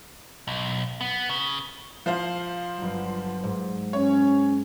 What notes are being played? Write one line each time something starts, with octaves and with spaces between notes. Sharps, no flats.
B1
B3
C#3
F3 C5 F5
G1 F#3
G#2
C#4 C#5